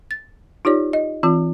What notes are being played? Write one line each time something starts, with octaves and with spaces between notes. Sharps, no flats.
A6
D#4 F4 G4 C#5 D5
D#5
E3 C4 F4